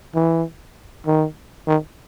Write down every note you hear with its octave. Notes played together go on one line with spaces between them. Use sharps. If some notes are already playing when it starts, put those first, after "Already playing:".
E3
D#3
D#3